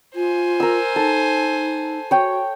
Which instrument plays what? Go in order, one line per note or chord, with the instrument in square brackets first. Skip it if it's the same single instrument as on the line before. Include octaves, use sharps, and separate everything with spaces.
[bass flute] F4 [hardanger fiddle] C5 G#5
[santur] A#4 E6
[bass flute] D#4 [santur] A4
[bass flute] F#4 [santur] C#5 G5